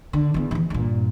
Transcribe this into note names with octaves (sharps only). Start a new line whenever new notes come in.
D3
E2 D3
D#3 E3
G2 A#2